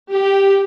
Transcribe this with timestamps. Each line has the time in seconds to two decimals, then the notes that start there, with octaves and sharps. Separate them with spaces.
0.10 G4